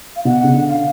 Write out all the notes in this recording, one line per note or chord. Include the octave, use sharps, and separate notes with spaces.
F5
B2 F#5
C#3
D3
F5